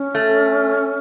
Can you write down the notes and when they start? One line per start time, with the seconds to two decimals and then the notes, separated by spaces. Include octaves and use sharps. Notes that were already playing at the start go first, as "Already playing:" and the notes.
Already playing: C#4
0.15 A3